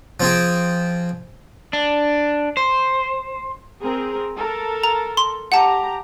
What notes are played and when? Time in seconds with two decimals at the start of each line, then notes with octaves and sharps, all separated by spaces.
0.20 F3 C4 G#4
1.73 D4
2.57 C5
3.82 C4 G#4 A#4
4.36 A4 A#4
4.84 A#5
5.17 C6
5.52 G4 F#5 A5 A#5